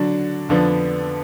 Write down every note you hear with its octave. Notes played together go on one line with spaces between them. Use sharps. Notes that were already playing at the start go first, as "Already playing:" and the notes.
Already playing: D3 F#3 D4
F2 D3 F3 B3 D4